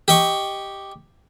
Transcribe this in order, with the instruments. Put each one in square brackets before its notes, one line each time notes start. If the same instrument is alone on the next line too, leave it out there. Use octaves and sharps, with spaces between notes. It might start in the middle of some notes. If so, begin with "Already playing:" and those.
[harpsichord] G4 D#5 C#6